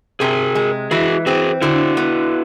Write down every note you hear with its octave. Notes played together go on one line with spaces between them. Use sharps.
C3 G#4 A#4
G#3
E3 F#4 G#4
C4 F#4 G#4
D3 E4 F#4
B3